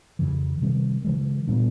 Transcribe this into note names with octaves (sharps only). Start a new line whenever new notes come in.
F2 C#3 E3
C3 D#3 G3 C4
C#3 E3 G#3
A#2 G3 B3 D4